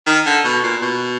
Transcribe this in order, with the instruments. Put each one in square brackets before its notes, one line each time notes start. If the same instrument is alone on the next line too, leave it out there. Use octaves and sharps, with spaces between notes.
[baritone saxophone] D#3
D3
B2
A#2
B2